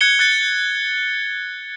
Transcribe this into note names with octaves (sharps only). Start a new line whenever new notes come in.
F#6 G#6 C#7 G7
F#6 A6 C#7